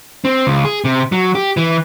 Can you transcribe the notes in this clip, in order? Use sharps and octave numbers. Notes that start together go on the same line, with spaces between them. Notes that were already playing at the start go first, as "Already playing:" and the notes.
C4
C#2
G#4
C3
F#3
G4
E3